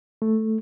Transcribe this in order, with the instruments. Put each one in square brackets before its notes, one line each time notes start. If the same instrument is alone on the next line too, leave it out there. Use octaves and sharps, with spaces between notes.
[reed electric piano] A3